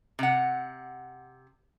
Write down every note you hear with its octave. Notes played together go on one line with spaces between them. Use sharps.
C3 F#5